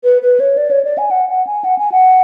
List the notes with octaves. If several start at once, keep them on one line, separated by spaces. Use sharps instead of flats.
B4
B4
C#5
D5
C#5
D5
G#5
F#5
F#5
G#5
F#5
G#5
F#5